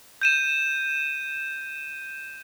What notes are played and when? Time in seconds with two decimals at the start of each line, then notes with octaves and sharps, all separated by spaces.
0.22 G6 D#7 E7